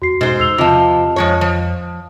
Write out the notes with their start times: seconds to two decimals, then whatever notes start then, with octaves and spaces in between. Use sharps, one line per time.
0.02 E2 F#4 C7
0.21 G#2 B2 C5
0.40 E2 E6 F7 G7
0.58 C3 F3 F4 D#5 A5
1.16 F2 F3 G#3 C#5
1.41 F3